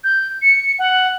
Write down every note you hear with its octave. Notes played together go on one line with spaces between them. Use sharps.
G6
C#7
F#5